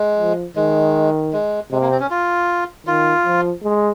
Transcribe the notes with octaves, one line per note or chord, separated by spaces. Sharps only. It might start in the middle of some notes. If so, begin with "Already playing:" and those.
Already playing: G#3
F3
D#3 G#3
G#3
C3 G#3
A#3
C4
C#4
F4
D#3 F4
F3
G#3